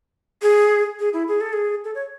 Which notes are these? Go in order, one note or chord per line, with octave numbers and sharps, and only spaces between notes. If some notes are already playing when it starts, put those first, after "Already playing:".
G#4
G#4
E4
G#4
A4
G#4
A4
C#5